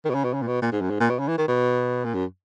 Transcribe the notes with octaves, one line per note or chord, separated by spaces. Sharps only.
D#3
B2
C#3
B2
C#3
A#2
B2
A#2
G#2
F#2
G#2
A#2
B2
C#3
E3
D#3
B2
A#2
F#2